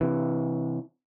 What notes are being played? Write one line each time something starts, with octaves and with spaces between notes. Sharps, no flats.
C3 E3